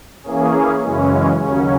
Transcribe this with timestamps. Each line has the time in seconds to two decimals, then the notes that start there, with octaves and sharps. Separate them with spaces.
0.23 E3 A#3 C#4 G#4
0.83 F#2 C#3 E3 G#3 C#4
1.42 D#2 C#3 F#3 C#4